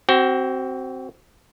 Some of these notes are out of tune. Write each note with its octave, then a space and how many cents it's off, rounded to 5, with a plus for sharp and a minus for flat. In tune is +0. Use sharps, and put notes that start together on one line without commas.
C4 +0 F#4 +30